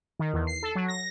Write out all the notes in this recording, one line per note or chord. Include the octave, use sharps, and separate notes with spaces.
D#3
E2
C7
A4
F#3
A#6